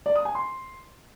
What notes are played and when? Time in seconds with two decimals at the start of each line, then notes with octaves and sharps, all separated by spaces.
0.06 D5
0.15 D#6
0.25 G#5
0.35 C6